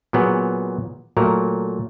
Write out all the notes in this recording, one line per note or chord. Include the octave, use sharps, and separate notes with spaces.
A#2 F#3 B3 G#4 F#5
A#2 F#3 A3 A#4